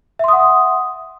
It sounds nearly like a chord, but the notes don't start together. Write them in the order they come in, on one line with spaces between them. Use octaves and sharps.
E5 C6 D#6 F#5